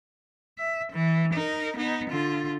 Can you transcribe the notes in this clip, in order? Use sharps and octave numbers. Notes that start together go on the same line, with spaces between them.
E5
E3
D#4 A#4
B3 D#4
D3 F4